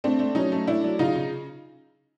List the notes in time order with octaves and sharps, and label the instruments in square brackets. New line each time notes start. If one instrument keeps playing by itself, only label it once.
[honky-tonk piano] A3 C4 D4
A3
F#3 C#4 D#4
A3
A3 D4 E4
F#3
C#3 D#4 F4
C#3